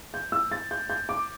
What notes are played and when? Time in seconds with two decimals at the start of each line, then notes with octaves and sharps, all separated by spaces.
0.14 G6
0.32 E6
0.52 A6
0.71 G6
0.90 G6
1.09 D6